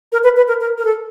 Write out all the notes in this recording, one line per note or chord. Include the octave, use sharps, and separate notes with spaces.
A#4
B4
B4
A#4
A#4
A#4
A4